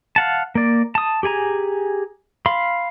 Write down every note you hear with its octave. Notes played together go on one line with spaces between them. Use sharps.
F5 F#5 A5
A#3 D5
A5 D#6
G4 G#4 G#5 A#5
F5 B5 C6